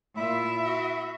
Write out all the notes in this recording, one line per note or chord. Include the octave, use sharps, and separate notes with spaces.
A#2 E4 F4 E5
F#4